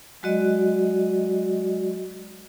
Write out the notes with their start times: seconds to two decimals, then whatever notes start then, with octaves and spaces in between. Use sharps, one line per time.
0.23 F#3 G#3 F#4 D5 D#5